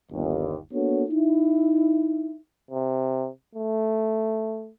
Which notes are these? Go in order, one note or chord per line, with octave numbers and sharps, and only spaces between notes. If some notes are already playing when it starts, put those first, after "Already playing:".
G1 D#2
A#3 B3 D4 F#4 A4 C#5
D#4 E4
C3
A3